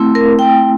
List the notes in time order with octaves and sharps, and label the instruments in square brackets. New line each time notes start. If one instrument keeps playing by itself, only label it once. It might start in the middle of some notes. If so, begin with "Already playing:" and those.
Already playing: [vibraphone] A3 C4 E4
A#4
G5